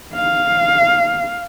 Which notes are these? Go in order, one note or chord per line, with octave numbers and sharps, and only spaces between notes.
F5